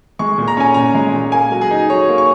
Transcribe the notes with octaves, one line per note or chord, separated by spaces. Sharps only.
G#3 C#6
A#2
A#5
C#4 G#5
A#2 A#5
G#3
A#2
A#3 G#5
F#3
G#4
D#4
F#3 C#5
A#3
C#6